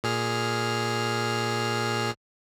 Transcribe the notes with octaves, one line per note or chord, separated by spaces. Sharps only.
A#2 G#4 F6